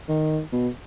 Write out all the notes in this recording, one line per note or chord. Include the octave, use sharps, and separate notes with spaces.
D#3
B2